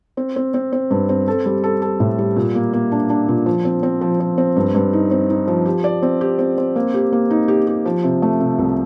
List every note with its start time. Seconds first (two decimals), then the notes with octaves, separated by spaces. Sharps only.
0.17 C4
0.36 C4
0.54 C4
0.73 C4
0.91 G2
1.09 C4
1.28 A4
1.46 G3
1.64 A4
1.82 A4
2.00 A2
2.18 G3
2.36 A#2
2.55 A#3
2.73 A#3
2.92 D4
3.10 D4
3.28 A#2
3.46 F3
3.65 C4
3.83 C4
4.01 F3
4.20 F3
4.38 C4
4.57 G2
4.75 G2
4.93 D#4
5.11 C4
5.30 D#4
5.48 F3
5.66 G4
5.84 D5
6.02 C4
6.21 G4
6.39 C4
6.58 C4
6.76 A#3
6.94 G4
7.13 A#3
7.30 D#4
7.48 G4
7.67 G4
7.86 F3
8.04 C3
8.22 A3
8.40 C3
8.59 C2